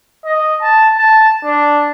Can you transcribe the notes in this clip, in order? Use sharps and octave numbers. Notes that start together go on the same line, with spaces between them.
D#5
A5
A5
D4